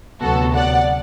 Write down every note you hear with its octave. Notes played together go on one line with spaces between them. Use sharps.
D2 C3 F#3 B3 F#4 A4
D5 F#5